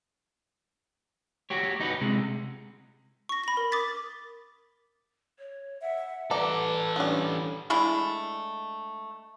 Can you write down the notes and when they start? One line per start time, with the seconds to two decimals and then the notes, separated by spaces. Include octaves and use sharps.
1.50 F#4 G4 C#5
1.80 D#4 F#4 B4
2.01 C3 G#3
3.29 C#6 A#6
3.44 B5 A#6
3.57 A#4
3.72 D6 D#6 A6 B6
5.38 C#5
5.81 E5 F#5
6.31 E3 G3 A4 B4 D5 A#5
6.96 G3 B3 C#4 D4
7.70 G#3 A3 D4 E4